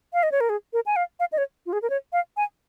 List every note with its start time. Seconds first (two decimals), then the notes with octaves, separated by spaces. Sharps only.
0.13 F5
0.23 D#5
0.32 C#5
0.41 A#4
0.49 G#4
0.73 A#4
0.86 G#5
0.96 F5
1.20 F5
1.32 D#5
1.38 C#5
1.66 F4
1.73 G#4
1.82 A#4
1.90 C#5
2.13 F5
2.37 G#5